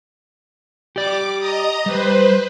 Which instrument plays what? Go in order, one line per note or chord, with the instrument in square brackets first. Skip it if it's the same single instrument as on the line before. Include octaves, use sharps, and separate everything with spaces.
[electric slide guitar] G4 D5 [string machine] D6
[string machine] D#5 A#5 D#6
[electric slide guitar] G3 [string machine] B4 C5